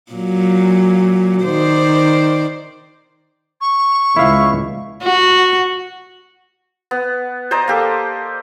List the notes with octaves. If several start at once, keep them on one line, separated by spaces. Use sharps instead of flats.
A#2 F#3
D#3 C5 D5
C#6
C#2 E4 E5 F5
F#4
B3
C5 D5 D#5 A#5
A#3 G4 A4